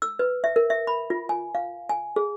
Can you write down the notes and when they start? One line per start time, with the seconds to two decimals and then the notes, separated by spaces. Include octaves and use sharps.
0.02 E6
0.19 B4
0.44 E5
0.56 A#4
0.70 E5
0.87 B5
1.10 F4
1.29 G#5
1.55 F5
1.89 G#5
2.16 G#4